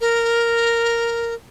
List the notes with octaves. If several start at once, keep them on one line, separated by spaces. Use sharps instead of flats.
A#4